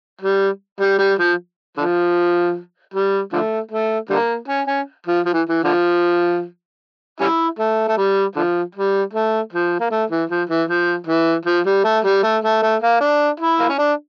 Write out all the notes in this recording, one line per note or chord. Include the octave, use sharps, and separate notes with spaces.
G3
G3
G3
F3
D3 F3
G3
D3 F3 A3
A3
D3 G3 A#3
C#4
C#4
F3
F3
E3
E3
D3 F3
G3 C#4 E4
A3
A3
G3
D3 F3
G3
A3
F3
A#3
A3
E3
F3
E3
F3
E3
F3
G3
A3
G3
A3
A3
A3
A#3
D4
E4
A#3
C#4
D4